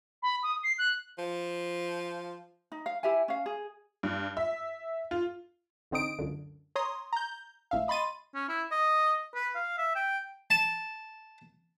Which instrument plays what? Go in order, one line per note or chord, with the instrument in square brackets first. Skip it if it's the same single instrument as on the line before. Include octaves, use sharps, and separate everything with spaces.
[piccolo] B5
D#6
C7
F#6
[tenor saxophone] F3
[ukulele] D#4
F5
E4 G4 E5 G#5
C#4 F5
G#4
[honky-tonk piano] G2
E5
F4
[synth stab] A1 D3 C4 D#4 D#6 D7
C#2 F#2 D3
C#5 A#5 C6 D#6
A#5 G6
G#1 A2 E5 F5
D#5 B5 C6 A6 D#7
[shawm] C#4
E4
D#5
B4
F5
E5
G5
[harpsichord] A5